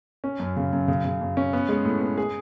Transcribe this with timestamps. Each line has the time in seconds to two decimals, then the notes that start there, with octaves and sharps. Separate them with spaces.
0.24 C#4
0.40 F#2
0.57 C#3
0.73 F#2
0.88 C#3
1.04 C#3
1.21 F#2
1.37 C#4
1.53 B3
1.69 G#3
1.85 A2
2.01 B3
2.18 G#4